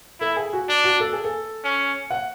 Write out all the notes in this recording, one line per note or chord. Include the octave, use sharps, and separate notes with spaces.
E4 A4
G#4
F#4
D4
F#4
A4
G#4
A4
C#4
F#5